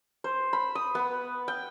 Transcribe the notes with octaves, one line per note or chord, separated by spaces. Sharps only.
C5
B5
D#6
B3
G5